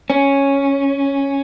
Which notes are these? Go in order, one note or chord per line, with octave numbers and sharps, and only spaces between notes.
C#4